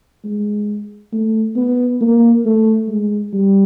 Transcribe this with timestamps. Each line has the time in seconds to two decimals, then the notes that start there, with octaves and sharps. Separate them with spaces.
0.24 G#3
1.13 A3
1.56 B3
2.01 A#3
2.45 A3
2.88 G#3
3.33 G3